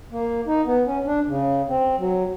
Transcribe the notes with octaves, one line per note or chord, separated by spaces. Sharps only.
A#3
D#4
B3
C#4
D4
C#3
C4
F#3